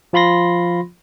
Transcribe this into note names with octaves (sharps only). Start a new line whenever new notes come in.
F3 F4 B5 C6 A#6